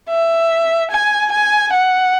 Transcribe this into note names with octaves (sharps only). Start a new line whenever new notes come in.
E5
G#5
G#5
F#5